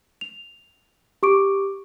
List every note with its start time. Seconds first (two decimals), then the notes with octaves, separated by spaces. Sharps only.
0.21 F7
1.23 G4 C#6 D6 D7